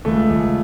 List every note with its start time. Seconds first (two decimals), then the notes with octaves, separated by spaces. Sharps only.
0.05 C#2 A3
0.30 C#2